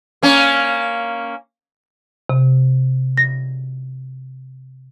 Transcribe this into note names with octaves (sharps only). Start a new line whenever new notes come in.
A#3 C#4
C3
A#6